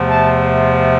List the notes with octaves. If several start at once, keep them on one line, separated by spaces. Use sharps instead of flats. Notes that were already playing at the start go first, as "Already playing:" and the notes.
Already playing: E2 C3 F3 A3
A5